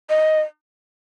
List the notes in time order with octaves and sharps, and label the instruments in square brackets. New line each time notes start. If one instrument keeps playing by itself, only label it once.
[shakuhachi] D#5